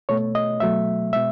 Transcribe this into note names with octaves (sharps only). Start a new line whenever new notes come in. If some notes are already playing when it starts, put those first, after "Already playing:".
B2 A3 C#5
D#5
B2 F#3 A3 E5
B2 G#3 E5